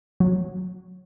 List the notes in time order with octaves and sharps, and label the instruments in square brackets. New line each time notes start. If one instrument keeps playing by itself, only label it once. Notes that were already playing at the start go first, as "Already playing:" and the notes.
[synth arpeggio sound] F#3